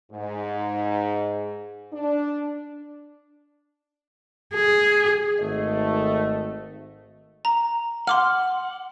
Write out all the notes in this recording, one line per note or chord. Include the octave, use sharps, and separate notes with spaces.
G#2
D4
G#4
G#1 A3 D#5
A#5
F#5 C6 D6 F6